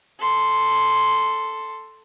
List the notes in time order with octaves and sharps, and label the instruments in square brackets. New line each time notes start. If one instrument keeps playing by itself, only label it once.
[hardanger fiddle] A4 C6